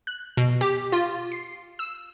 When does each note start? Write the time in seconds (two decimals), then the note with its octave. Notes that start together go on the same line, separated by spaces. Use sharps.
0.07 F#6
0.37 B2
0.61 G4
0.92 F4
1.32 C7
1.79 E6